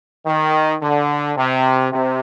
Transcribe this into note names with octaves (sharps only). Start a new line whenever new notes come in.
D#3
D3
C3
C3